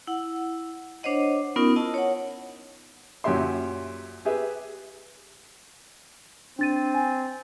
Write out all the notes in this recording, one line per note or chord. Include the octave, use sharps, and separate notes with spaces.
E4 F#5
D4 C5 C#5 D#5 F#5
B3 C#4 D#4 F4 A#4
E4 D#5 A5
C#5 F#5
F#2 A#2 C#4 G4 E5 C6
G4 G#4 B4 E5
C4 D4 A6 D#7
G#5